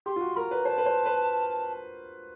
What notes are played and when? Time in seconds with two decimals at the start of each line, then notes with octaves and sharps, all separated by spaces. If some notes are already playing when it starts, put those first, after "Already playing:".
0.06 G4 C6
0.16 F4
0.21 F#4
0.36 A#4 B5
0.40 A#5
0.51 B4
0.65 C5 A5
0.78 B4
0.86 C5
1.06 B4